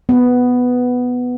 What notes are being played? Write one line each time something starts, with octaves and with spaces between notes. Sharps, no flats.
B3